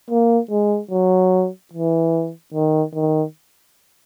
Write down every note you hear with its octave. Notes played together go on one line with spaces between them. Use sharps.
A#3
G#3
F#3
E3
D#3
D#3